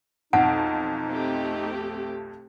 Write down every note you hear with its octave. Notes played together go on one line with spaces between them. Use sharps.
B1 F2 D#4 F#5 D7
A3 C4 G4